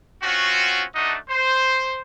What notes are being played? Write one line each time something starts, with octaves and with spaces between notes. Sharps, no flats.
C4 C#4 F4 F#4
A3 D4 D#4 F#4 D#5
C5